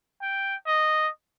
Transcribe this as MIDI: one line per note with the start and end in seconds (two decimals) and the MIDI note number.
0.22 0.56 79
0.66 1.09 75